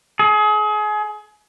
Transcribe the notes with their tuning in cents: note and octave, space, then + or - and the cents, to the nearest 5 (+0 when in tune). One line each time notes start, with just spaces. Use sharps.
G#4 +30